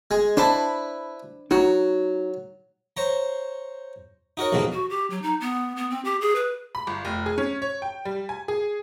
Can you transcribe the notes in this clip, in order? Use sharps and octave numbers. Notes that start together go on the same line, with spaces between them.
G#3
D4 E4 B4 C5 A5
F#3 D#4 F#4
C5 C#5 A#5
D#4 F#4 A#4 C#5
A#1 D#2 B2 D3 G#3 A#3
F#4
G4
F#3
D#4
B3
B3
C4
G4
G#4
B4
B5
G1
F1
G#4
C#4
C#5
G5
G3
G#5
G#4